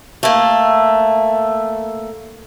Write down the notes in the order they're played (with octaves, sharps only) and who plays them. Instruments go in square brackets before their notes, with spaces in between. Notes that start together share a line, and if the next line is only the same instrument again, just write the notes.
[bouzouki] A3 A#3